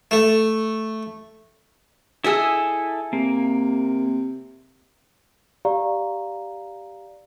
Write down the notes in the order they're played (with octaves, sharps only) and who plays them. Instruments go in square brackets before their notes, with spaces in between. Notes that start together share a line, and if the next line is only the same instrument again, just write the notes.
[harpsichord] A3
[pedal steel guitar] E4 A4 E6 [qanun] G#4 D#5 E5
[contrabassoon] C3 [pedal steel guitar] A#3
[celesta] G4 D5 F5 A#5